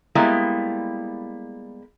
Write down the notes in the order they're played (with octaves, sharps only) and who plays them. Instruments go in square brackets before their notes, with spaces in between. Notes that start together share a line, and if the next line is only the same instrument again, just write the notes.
[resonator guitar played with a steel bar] G3 G#3 A#3 B3 E4